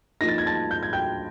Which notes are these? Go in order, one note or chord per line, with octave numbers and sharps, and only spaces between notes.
F3 A#3 D#4 A#6
A6
G#6
A5 A6
G6
G#6
G5 G6